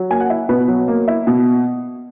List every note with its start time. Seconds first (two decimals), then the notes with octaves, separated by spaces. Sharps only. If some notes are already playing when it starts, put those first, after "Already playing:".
Already playing: F#3
0.10 A#3 G#5
0.20 F#5
0.30 E4
0.49 B2 B4
0.68 F#3
0.88 A#3
1.08 E4
1.27 B2